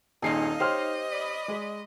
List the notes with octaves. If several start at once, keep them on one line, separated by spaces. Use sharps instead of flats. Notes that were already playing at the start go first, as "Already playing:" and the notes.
D#1 G2 A#2 D#4 G#4 D#5 F5 C7
G4 C5 C#5 F6
D5 B5 D#6
G#3